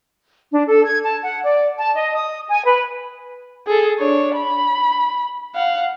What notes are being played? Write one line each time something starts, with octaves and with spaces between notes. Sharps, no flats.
D4
A4
G#6
A5
F#5
D5
A5
D#5
D#6
G#5
B4
G#4 A4
D4 C#5
B5
F5 F#5